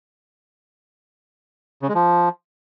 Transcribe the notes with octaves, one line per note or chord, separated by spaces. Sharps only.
C#3
G#3
F3